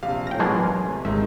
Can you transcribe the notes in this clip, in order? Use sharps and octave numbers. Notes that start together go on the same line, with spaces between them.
A#1 C3 G4 F5
A2 C#4 G5 A#6
B2 E3 F#3 G#3 A#3 D4 G#5 C6
C3 A3
G#1 D#3 G#3 D#4 E5